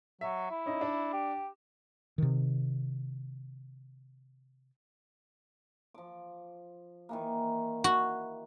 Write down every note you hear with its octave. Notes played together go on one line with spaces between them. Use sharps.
F#3 E5
E4
C#4 D#4 D#5
D4
G4
C3 D#3
F3 D6
D#3 E3 A#3
F#4